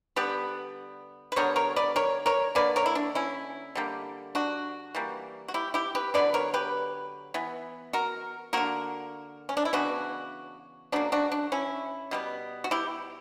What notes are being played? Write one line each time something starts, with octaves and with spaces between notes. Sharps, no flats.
D3 G3 B3 G4 B4
B4
D3 G3 B3 A#4 C#5
A#4 C#5
B4 D5
A#4 C#5
A#4 C#5
D3 A#3 B4 D5
A#4 C#5
E4
D4
C#4 E4
D3 G3 A#3
D4 F#4
E3 G3 A#3
F#4
E4 G4
E4 G4
G4 B4
D3 F#3 B3 B4 D5
A#4 C#5
G4 B4
E3 B3
F#4 A#4
D3 A#3 F#4 A#4
C#4
D4
E4
C#3 E3 B3 D4 F#4
C#3 F#3 A#3 D4 F#4
D4 F#4
D4
C#4 E4
B2 G3 B3
F#4
E4 G4